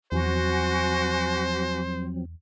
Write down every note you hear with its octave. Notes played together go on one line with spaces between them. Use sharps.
E2 F3 F#3 C4 F#4 C5 G#5